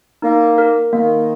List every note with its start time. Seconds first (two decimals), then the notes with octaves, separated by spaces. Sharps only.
0.22 A#3 D#4
0.58 A#4
0.93 D#3 A#3